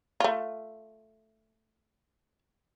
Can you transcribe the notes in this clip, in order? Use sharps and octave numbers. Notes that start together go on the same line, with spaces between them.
A3 F4